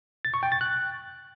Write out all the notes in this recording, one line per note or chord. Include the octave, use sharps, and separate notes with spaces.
A6
C#6
G5
A6
F#6